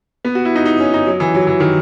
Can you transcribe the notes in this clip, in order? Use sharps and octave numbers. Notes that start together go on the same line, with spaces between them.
B3
F#4
E4
D#4
D#4
C#4
D#4
F#3
E3
F#3
E3
D#3